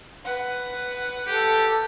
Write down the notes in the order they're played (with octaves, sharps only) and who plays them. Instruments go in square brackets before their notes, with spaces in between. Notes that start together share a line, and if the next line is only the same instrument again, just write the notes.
[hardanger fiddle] B4 F#5
[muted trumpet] G4 [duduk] A4